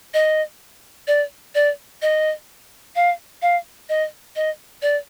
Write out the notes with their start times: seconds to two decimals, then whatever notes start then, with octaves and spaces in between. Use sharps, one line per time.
0.14 D#5
1.07 D5
1.55 D5
2.02 D#5
2.96 F5
3.42 F5
3.89 D#5
4.36 D#5
4.82 D5